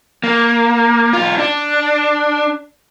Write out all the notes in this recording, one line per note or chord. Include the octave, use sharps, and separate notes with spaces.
A#3
B1 F4
D4